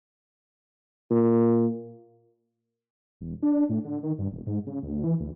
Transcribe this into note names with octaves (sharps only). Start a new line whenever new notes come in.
A#2
E1
D4
A2
D3
D#3
G2
E1
G#2
C#3
D2
E3
D2